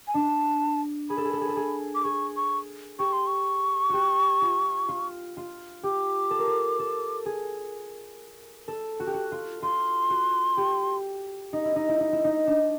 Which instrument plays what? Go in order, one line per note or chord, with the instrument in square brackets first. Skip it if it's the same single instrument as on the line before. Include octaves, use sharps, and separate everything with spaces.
[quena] G#5
[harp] D4 [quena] A5
[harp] G#4 [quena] B5
[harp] A4
G#4
A4
G#4
A4
G#4
[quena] D6
[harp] G#4 [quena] C#6
[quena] C#6
[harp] G4 [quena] C#6
[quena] C6
C#6
[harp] F#4 G4
F4
F4
F4
[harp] G4 [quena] D6
[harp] A4
A#4
A4
A4
G#4
A4
F#4
G4
F#4
F4
[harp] F4 [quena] C6
[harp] F#4
G4
D#4
E4
D#4
E4
D#4
E4
D#4
D4